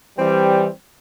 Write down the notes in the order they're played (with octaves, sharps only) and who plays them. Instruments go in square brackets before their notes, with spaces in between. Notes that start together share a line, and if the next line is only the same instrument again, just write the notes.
[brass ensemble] E3 G3 [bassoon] C4